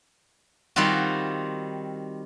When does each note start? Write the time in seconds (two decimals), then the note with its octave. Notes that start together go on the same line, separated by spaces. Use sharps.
0.76 D#3 G3 C4 F4 F#4